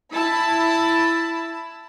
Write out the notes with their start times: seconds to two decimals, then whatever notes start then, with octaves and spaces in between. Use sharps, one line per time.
0.13 E4 A5 B5